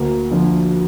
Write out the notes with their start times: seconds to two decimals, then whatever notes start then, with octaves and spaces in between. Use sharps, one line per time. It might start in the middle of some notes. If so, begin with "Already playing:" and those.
Already playing: D2 A#3
0.31 D3 F3